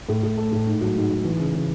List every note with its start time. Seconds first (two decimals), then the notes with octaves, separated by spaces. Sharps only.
0.09 A2
0.23 A2
0.37 A3
0.52 A2
0.66 G#2
0.81 F#3
0.95 G#2
1.10 G#2
1.24 E3
1.39 C#3
1.54 C#3